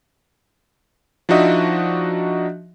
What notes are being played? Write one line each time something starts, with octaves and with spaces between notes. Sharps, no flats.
F3 D4 D#4 F#4 D#5 E5